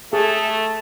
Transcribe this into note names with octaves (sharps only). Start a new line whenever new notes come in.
A3 G#4 A4